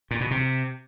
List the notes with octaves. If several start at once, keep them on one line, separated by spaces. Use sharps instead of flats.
A#2
B2
C3